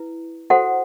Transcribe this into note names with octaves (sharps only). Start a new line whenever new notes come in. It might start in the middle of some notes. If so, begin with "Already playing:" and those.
Already playing: E4 B4
F#4 A4 C5 F#5